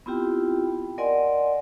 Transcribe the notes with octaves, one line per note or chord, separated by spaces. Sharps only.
B3 C4 E4 F4 G4 G5
A#4 D5 D#5 F#5 G#5 C6